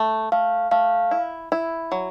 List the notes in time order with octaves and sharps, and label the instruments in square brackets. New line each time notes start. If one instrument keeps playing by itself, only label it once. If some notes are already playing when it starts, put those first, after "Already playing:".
Already playing: [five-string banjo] A3
[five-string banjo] A3 [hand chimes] F5
[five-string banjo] A3 [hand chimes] F5
[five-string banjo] E4
E4
F#3